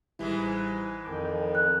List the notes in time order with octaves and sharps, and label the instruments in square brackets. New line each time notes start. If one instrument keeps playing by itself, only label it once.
[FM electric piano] A1 G3 E4 [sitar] G#2 E3 G#3
[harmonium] F2 D#3 [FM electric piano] A5 D6 G6
[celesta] F#6